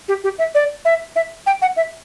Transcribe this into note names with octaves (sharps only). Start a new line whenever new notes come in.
G4
G4
E5
D5
E5
E5
G5
F#5
E5